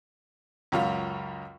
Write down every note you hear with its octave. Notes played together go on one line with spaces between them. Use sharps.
C#2 F#2 F4